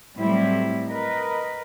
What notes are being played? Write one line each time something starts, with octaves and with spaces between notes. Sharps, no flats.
A2 F#3 G3 C4 E4
A#4 B4 D#5